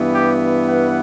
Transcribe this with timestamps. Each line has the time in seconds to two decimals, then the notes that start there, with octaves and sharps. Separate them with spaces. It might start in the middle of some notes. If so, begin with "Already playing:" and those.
Already playing: G2 E3 B3
0.12 G4
0.68 F#5